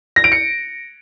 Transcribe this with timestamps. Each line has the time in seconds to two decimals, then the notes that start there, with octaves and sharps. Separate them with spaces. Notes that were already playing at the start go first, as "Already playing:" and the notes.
0.16 A#6
0.24 D7
0.32 C#7